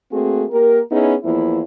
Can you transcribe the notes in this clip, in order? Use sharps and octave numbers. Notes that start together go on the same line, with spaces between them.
A3 A#3 C4 F#4 G#4
A#3 G4 A#4
B3 C#4 D#4 E4 G#4
E2 F3 A#3 E4